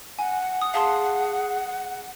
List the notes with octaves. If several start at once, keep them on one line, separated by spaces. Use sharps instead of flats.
F#5 G#5
D#6
G#4 F5 A5 C6